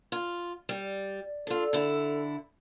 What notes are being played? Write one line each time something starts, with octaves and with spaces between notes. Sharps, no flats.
F4
G3
D4 F4 A4
D3 E4